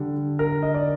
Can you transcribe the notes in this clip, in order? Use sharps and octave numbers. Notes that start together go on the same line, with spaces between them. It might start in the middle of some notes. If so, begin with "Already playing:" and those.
Already playing: D3 G3
A#4
D#5
D5